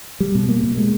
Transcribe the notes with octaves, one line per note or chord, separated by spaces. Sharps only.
G3
B2
A#3
B2
G#3